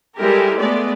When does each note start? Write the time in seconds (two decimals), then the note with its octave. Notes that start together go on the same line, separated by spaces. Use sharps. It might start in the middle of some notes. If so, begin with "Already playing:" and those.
0.17 G3 G#3 E4 G4 A4 A#4
0.58 G#3 A3 B3 D5